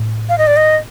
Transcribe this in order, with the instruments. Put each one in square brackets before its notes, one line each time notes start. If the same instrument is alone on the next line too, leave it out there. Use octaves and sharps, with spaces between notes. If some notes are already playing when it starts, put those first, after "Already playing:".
Already playing: [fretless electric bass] A2
[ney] F5
D#5
D5
D#5